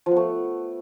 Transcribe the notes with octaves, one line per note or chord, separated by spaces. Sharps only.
F3
B3
A3